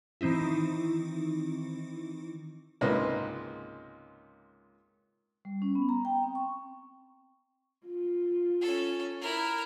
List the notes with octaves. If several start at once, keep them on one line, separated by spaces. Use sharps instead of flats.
D#3 E3 C4 D#4 E4
C#2 G#2 C3 A#3 B4 D#5
G3
C#4
B3
A#5
G5
C4
C#6
F4
C#4 A4
E4 A#4